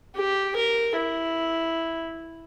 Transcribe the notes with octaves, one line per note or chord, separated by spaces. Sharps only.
G4
A#4
E4